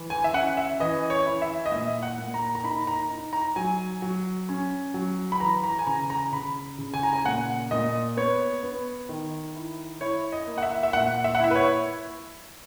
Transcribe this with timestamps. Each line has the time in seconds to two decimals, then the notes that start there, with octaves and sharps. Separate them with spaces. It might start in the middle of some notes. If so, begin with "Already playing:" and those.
Already playing: E3
0.10 G#5
0.24 E5
0.33 C#4 F#5
0.57 E5
0.80 E3 D#5
1.10 C#5
1.27 E4
1.42 E5
1.66 D#5
1.72 A#2 E5
2.02 F#5
2.19 A#2
2.34 A#5
2.55 A#5
2.64 D#4 B5
2.87 A#5
3.11 D#4
3.33 A#5
3.56 F#3 G#5
4.02 F#3
4.49 C#4
4.94 F#3
5.32 B5
5.40 E3 A#5
5.64 A#5
5.79 G#5
5.87 C#3 A#5
6.10 A#5
6.33 C#3 B5
6.78 C#3
6.94 G#5
7.03 A#5
7.13 G#5
7.25 A#2 F#5
7.71 A#2 D#5
8.17 B3 C#5
8.63 B3
9.09 D#3
9.56 E4
10.01 E4 C#5
10.32 D#5
10.47 A#3
10.58 F#5
10.62 E5
10.83 E5
10.93 A#2 F#5
11.24 E5
11.35 F#5
11.40 E4 E5
11.50 B4
11.56 C#5